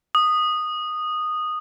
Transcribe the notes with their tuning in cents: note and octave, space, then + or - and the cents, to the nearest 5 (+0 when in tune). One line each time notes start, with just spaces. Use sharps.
D#6 -10